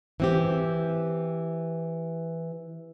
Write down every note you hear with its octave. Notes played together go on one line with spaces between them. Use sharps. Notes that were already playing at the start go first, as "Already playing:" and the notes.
E3 C4 G4